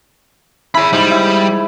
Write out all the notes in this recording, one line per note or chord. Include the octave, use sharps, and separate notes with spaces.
E4 G#4 B5
G#2 G3
E4